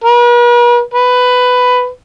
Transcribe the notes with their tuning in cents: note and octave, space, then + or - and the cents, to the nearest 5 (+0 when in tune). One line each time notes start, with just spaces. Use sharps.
B4 -45
B4 +10